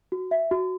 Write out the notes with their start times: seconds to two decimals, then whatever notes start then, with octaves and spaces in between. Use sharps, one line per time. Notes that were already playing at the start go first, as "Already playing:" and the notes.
0.12 F#4
0.31 E5
0.51 F#4